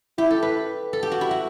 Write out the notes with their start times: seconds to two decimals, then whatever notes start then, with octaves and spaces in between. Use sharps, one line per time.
0.18 E4 G4
0.31 A4
0.42 B4
0.93 A4
1.03 G4
1.11 F#4
1.21 E4
1.31 F#4